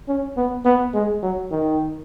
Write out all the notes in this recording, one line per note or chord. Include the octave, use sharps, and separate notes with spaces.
C#4
B3
B3
G#3
F#3
D#3